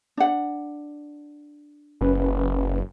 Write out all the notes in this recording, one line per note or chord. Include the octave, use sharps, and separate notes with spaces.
D4 F#5
F#1 C#4 B4